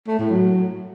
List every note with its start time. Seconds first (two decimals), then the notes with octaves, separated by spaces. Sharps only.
0.07 A3
0.19 A2
0.30 F#3